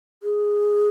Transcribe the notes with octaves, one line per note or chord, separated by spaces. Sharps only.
G#4